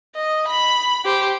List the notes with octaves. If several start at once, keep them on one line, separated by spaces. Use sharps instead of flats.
D#5
B5
G4 C5